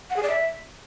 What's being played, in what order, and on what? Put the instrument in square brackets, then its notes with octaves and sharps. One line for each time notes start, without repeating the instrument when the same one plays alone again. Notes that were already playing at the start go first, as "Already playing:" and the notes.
[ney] F#5
G#4
D5
E5